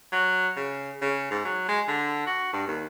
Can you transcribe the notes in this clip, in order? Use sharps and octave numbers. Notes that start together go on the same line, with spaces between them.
F#3
C#3
C#3
G#2
F#3
G#3
D3
F#4
G2
D#2